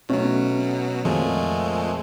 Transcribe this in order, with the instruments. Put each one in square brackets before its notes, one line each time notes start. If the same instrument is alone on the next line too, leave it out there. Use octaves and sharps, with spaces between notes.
[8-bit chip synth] B2 F#3 [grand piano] A3 C#4 A4
[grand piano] F2 [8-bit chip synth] A#2 G#3 A3